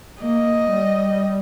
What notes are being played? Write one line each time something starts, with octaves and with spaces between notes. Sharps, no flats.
A#3 D#5
G3